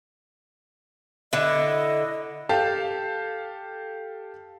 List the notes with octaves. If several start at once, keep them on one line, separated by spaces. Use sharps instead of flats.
D3 E4 D#5
G4 A4 F5 A5